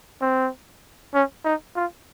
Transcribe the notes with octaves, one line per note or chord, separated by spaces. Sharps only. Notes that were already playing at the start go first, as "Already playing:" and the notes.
C4
C#4
D#4
F4